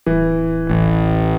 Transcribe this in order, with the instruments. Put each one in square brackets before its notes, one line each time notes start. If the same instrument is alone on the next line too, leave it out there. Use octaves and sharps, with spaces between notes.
[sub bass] D1 [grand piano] E3
[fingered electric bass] A1